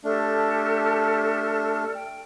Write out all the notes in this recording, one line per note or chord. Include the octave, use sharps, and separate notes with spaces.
A3 D4 G4 A4 F6
G5